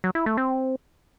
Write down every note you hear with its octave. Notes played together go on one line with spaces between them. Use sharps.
F#3
E4
A3
C4